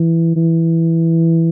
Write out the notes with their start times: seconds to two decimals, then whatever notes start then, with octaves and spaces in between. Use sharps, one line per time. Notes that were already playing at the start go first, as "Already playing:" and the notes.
Already playing: E3
0.36 E3